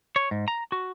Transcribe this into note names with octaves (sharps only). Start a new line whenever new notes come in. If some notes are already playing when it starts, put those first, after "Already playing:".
C#5
G#2
A#5
F#4